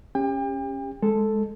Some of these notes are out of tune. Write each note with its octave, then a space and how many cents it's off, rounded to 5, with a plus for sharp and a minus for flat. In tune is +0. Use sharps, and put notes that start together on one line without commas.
C#4 -15 G4 +25 G5 +40
G#3 +0 A4 +0